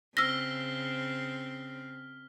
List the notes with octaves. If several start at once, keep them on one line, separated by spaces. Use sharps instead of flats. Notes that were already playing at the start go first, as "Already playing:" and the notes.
C#3 C4 E6 F6 A#6 B6 G7